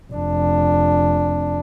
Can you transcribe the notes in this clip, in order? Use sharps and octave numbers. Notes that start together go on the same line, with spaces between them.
F1 D4